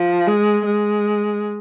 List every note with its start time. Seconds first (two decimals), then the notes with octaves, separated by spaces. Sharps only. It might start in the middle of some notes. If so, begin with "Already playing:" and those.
Already playing: F3
0.27 G#3
0.65 G#3